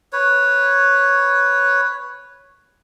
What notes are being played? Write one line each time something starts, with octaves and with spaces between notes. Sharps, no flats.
B4 C#5